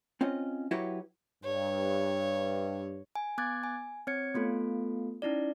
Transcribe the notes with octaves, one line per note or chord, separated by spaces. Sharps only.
C4 C#4 F4 D#5
F#3 E4 F#4 G4 B4 C#5
G2 C#5
G#5
B3 D6 F#6 G#6 A6
G#5
C4 C#5 G#6 C#7
A3 B3 F4 A4
C#4 D#4 E4 D5